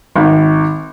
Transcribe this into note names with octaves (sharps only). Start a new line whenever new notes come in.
G#1